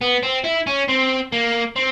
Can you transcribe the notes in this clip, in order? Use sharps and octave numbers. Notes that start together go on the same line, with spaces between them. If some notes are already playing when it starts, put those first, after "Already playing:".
B3
C4
E4
C#4
C4
A#3
C4